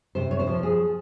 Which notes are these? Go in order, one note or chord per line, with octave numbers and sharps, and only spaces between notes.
C3 C5
C#5
C5
F3
G#4